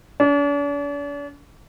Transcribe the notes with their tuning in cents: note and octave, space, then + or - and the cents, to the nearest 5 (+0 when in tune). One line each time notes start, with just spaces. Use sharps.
D4 -45